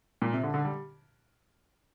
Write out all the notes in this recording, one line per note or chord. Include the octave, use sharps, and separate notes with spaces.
A#2
C3
D3
D3
G3